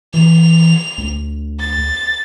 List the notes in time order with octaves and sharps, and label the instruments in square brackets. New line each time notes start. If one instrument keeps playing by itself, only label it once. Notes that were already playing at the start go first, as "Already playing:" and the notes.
[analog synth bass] E3 [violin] F7
[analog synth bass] D2
[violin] A6